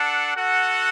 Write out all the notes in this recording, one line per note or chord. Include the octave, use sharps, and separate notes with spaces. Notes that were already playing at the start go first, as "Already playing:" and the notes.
Already playing: D4 A4 F#5
F#4 A4 F#5